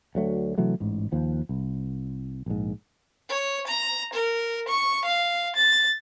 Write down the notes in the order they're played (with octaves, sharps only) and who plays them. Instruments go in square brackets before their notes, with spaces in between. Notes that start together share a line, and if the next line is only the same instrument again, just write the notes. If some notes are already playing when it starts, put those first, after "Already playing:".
[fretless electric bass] D2 F#3 A3
C3 E3 F#3 A3
A1 G#2
D#2 F3
C2
A#1 G#2
[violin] C#5
A#5
A#4
C#6
F5
A6